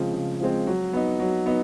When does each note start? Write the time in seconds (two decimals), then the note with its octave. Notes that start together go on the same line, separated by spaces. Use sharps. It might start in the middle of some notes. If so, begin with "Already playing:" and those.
Already playing: C#3 F3 G#3 C4
0.13 C#3
0.40 F3 G#3 C4
0.67 F#3
0.93 B3 D#4
1.20 F#3
1.46 B3 D#4